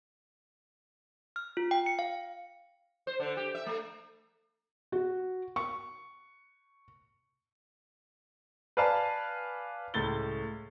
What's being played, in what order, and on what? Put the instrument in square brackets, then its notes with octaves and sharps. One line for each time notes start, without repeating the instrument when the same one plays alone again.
[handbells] F6
F4
G5
C#7
F5
[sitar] C5
D3
G4
E5
A3
[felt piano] F#4
C#6
[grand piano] B4 D5 F5 G#5 A5 B5
C#2 A2 A6 G7